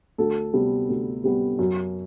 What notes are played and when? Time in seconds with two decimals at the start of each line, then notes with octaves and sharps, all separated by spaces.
0.18 D2 A4
0.54 C3 G3 B3
0.89 D2
1.24 C3 G3 B3
1.59 F#2